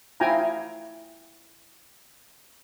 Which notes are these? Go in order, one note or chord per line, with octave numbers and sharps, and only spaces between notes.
E4 F4 G5 G#5 A#5